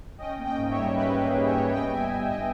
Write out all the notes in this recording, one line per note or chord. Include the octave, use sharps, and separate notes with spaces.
C#4 D#5 G5
A#3
D#5 G5
G#2
C#5 E5
G3
C#4 B4 D#5
A#3
G#4 B4
G#2
C#5 E5
G3
B3 D#5 G5
G3 E5 G#5
G1 E5 G#5
G2 D#5 G5